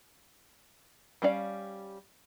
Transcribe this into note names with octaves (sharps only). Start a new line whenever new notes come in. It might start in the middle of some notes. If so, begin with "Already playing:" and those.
G3 C#4 D4 D5 F5